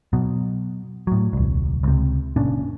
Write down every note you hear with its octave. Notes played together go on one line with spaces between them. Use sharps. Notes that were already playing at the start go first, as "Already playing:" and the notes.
B2 F#3
A2 F#3
D#1 C2
C#2 C3
F#1 A#2 C#4 D4